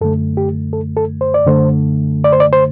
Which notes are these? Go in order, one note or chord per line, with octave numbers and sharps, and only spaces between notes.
F#2 D3 A3 A4
G4
A4
A4
C5
D5
F#2 D3 A3 C5
D5
C5
D5
C5